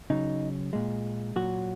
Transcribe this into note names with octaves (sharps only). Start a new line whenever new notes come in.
C#3 F#3 D#4
A#2 G#3
A#2 F#3 F#4